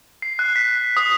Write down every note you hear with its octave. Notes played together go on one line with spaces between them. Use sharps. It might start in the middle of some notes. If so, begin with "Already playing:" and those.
C7
F#6
B6
D#6